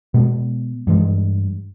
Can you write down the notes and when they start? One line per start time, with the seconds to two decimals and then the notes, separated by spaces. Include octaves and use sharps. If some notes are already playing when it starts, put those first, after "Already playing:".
0.14 B2 G#3 B3
0.87 G2 E3 G#3